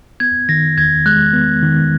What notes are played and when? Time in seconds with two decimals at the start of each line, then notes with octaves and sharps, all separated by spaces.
0.20 B3 G#6
0.49 D#3 A#6
0.77 E2 G#6
1.06 G#3 F#6
1.33 B3
1.63 D#3